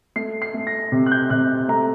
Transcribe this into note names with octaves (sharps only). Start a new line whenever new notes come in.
A3 C7
C7
A3
A#6
C3
F#6
G6
C3 F#6
A3 A#5